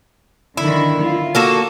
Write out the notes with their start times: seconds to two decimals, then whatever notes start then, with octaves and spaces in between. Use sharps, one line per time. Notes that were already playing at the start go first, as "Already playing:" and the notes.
0.57 D3 D#3 E4
1.00 F4
1.35 A#3 F#4 A4